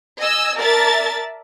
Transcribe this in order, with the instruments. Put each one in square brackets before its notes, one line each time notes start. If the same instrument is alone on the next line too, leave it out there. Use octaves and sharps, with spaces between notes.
[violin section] D#5 G#5 E6
A#4 D5 E5 A5 A6